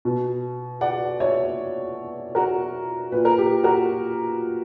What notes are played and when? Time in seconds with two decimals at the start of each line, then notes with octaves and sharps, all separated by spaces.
0.05 B2
0.81 D5 F#5
1.20 C#5 E5
2.35 F#4 A#4
3.12 A#2 B4
3.25 A#4
3.38 G4
3.63 F#4 A#4